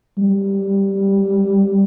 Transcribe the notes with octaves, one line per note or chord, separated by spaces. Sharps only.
G3